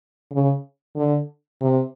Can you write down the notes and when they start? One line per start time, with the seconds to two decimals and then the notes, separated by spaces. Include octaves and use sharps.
0.32 C#3
0.96 D3
1.61 C3